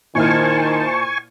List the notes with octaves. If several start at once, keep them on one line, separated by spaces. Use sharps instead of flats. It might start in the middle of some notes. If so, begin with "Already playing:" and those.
A#2 D#3 E4 C5 G#5 A5 C#6 F6